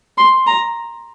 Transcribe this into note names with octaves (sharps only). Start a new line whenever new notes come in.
C6
A#5